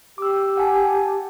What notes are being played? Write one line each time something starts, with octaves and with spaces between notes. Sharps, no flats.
G4 D6 E6
F#5 G#5 A5